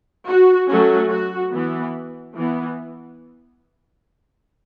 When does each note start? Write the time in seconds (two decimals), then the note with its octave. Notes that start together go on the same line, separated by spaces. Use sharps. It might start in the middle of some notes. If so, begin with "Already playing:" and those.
0.27 F#4
0.68 F#3 A3 C#4 F#4
1.10 F#4
1.51 E3 B3
2.35 E3 B3